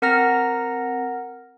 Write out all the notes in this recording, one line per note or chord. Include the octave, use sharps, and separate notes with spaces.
C4 A#4 F#5 A#5 F6 A#6